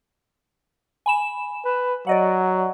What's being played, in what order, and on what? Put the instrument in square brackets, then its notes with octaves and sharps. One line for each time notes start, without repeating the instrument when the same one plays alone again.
[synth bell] G#5 B5 E7
[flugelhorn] B4
[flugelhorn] F#3 [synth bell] D5 D#5 F#5